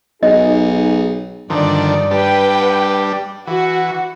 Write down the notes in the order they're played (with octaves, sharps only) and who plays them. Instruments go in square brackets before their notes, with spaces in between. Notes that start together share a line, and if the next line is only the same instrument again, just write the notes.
[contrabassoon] B1 [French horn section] D#4 F#4 G#4 [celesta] D#5
[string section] G2 D5 [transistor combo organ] D3 D#3 F3
[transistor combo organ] G3 D4 [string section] B4 G5
[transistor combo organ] E3 [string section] F#4